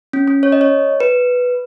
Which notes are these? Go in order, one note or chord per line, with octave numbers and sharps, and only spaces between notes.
C#4
C#4
C#5
D#5
C#5
B4